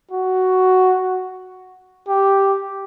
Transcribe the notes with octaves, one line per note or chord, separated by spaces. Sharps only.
F#4
G4